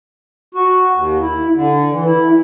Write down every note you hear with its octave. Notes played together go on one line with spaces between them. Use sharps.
F#4
D#2
E4
D3
E3
E4